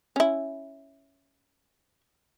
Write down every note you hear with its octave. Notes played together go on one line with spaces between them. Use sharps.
C#4 E4